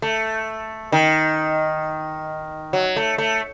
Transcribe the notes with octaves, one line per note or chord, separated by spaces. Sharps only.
A3
D#3
F#3
A3
A3